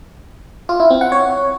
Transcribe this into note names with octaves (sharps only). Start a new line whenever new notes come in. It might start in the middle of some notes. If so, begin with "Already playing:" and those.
F4
E4
C4
F#5
C#5